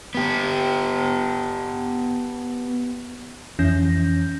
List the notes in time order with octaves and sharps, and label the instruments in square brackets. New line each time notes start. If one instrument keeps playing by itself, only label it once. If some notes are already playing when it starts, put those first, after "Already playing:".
[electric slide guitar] B3 G4
[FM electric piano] F2 E3 C#4 G6 A#6